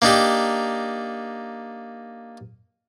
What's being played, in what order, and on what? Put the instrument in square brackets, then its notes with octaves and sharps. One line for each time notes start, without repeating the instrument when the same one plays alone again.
[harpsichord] A#3 D4 D#4 G4